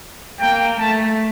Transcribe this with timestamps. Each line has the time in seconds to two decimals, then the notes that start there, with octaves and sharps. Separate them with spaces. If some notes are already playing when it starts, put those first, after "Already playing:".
0.40 A#3 G5
0.79 A3 A5